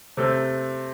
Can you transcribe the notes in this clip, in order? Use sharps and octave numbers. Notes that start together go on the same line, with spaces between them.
C3 A3 C4 A4